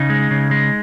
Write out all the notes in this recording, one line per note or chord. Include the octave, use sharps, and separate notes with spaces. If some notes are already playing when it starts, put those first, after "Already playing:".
Already playing: C#3 D#4
G#3
C#3
G#3